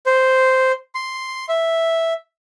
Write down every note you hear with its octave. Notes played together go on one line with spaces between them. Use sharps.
C5
C6
E5